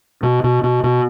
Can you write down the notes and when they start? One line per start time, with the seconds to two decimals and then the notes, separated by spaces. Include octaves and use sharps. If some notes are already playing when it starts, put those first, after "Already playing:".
0.23 B2
0.44 B2
0.63 B2
0.83 B2